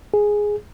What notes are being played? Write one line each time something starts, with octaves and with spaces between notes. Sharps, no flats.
G#4